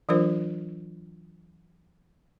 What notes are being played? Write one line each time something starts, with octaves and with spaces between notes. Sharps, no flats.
E3 F#3 D4 F4 A#4 C5